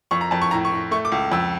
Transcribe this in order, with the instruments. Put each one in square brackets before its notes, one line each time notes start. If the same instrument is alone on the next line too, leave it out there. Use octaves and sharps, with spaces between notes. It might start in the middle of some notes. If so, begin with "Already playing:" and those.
[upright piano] F2 C#6
A#5
F2 A5
C#6
A2 A#5
C#6
A2
A3 C#6
D6
C#2
F2 E6